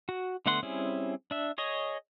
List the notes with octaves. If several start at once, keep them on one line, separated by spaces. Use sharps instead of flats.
F#4
D3 A3 B3 F#5 C6
G3 C4 C#4 E4 G#4
D4 E5
G#4 C#5 D#5